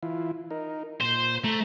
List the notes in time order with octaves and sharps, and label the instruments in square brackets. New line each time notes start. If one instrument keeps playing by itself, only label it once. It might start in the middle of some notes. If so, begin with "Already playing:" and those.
[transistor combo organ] E3 E4 F4
D#4 A#4
[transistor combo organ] A#2 [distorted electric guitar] C5
[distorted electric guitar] A3 [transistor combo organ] A#5